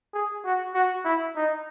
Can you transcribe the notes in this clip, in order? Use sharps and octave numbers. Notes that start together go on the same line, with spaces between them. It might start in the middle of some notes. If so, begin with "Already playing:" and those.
G#4
F#4
F#4
E4
D#4